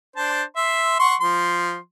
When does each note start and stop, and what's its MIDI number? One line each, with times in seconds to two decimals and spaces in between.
0.16 0.43 62
0.16 0.43 72
0.16 0.43 81
0.56 0.96 76
0.56 0.96 84
0.99 1.15 78
0.99 1.15 84
0.99 1.15 85
1.21 1.77 53
1.21 1.77 84